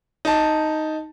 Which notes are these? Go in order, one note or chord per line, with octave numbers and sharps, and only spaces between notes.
D#4 A5